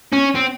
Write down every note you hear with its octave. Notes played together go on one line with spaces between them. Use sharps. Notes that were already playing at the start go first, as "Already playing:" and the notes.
C#4
C4